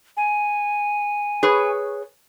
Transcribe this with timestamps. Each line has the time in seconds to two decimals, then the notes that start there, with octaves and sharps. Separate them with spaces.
0.17 G#5
1.43 G#4 B4 C#5